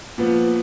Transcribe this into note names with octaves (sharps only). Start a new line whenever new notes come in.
A#2 F3 B3